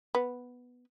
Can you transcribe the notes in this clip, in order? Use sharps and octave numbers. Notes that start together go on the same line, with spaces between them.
B3